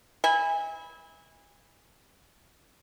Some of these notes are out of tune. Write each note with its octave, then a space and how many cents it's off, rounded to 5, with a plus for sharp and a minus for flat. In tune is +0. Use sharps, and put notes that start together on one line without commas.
E5 -35 G#5 -30 B5 -10